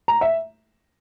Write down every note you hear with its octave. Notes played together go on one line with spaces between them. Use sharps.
A#5
E5